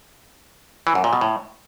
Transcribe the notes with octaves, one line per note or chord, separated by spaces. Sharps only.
E3
F#2
A#2
B2
A2